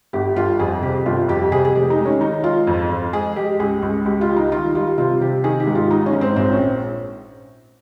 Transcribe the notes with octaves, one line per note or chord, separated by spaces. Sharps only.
G1 G4
G1 F4
F2 G#4
C3 G4
G1 F4
F2 G4
C3 G#4
G#4
F1 G4
D#4
G#3
C#4
D#3 D#4
G#3 F4
F2
F2
G#3 G#4
G#3 G4
C#2 G#4
C#2
C#2 G4
F4
G3
D#4
D#3 F4
G3 F4
C3 F4
C3 G4
D#3 G#4
G4
G#2
F4
G#3 D#4
C#4
G#2
C4
A#1 C4
C#4